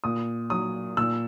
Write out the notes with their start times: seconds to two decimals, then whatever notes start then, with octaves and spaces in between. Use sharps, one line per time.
0.04 A#2 D#6
0.50 F#3 D#6
0.97 A#2 E6